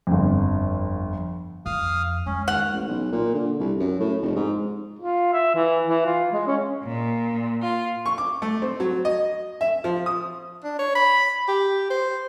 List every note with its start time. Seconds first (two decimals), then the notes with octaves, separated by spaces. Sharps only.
0.07 G1 F2
1.66 F2 F5 D#6 F6
2.26 G#3 C#4
2.48 D#2 F#5 F6
2.73 A1
2.88 B1
3.12 A#2
3.34 D3
3.59 C2
3.79 F#2
4.00 A2
4.22 F1
4.36 G#2
4.99 F4
5.33 E5
5.55 E3
5.87 E3
6.06 F4
6.33 G#3
6.47 C#4
6.85 A#2
7.61 F4
8.06 C#6
8.18 D6
8.42 A3
8.62 C4
8.80 F#3
9.05 D#5
9.61 E5
9.84 F3
10.06 D#6
10.64 D4
10.79 C#5
10.95 B5
11.48 G4
11.90 C5